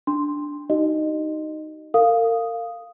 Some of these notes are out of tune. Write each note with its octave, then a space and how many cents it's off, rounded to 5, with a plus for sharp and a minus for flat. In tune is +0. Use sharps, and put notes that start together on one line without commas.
D4 +0 C6 +0
D#4 +0 F#4 +45 D#5 -20
A#4 -40 F5 +0 D#6 +0